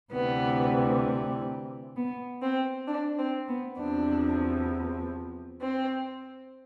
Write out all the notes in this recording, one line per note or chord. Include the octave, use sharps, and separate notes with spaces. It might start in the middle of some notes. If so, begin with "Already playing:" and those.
D2 C3 E3 G3 B3
B3
C4
D4
C4
B3
E2 C3 F3 D4
C4